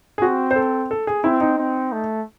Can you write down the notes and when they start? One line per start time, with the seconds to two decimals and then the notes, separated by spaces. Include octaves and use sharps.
0.18 G#4
0.22 C4 F#4
0.51 C5
0.56 A4
0.91 A4
1.07 G#4
1.24 C4 E4
1.40 D#4
1.58 C4
1.92 A3